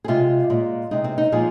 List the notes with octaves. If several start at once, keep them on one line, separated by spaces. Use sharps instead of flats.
G#4
C3 G#3 F4
A#2 G#3
C3 G#3 D#4
C4
D#4
A#2 F3 G#3 G#4